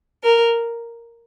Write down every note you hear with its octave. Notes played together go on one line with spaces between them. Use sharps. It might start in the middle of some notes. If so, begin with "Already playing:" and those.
A#4